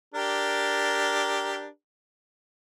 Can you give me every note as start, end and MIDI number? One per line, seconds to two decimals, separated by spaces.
0.14 1.67 62
0.14 1.67 67
0.14 1.67 70